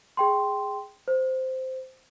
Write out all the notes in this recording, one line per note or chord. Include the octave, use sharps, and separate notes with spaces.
G#4 G5 C6
C5